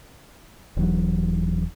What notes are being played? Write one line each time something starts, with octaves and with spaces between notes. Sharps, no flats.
D#1 E3 F#3